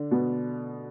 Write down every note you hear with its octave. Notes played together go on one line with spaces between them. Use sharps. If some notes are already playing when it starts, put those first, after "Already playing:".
Already playing: D3 D4
B2 B3